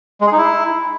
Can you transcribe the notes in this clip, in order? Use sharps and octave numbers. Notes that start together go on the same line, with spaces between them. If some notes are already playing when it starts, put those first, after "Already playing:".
G#3
G#4
D#4
E4